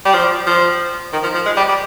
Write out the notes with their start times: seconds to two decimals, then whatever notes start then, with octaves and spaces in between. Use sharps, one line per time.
0.05 G3
0.14 F3
0.47 F3
1.13 D#3
1.23 F3
1.35 F3
1.46 G#3
1.57 G3
1.68 G3